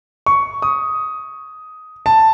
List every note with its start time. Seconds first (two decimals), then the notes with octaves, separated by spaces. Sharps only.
0.26 C#6
0.62 D#6
2.06 A5